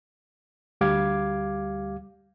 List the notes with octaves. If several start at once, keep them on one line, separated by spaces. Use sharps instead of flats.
D2 G3 G4 F5 D6 G#6